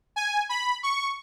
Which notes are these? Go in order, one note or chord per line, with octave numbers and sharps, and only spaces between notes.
G#5
B5
C#6